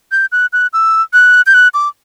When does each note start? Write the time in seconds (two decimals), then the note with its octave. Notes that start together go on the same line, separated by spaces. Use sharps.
0.12 G6
0.32 F#6
0.53 F#6
0.73 E6
1.13 F#6
1.46 G6
1.54 F#6
1.74 D6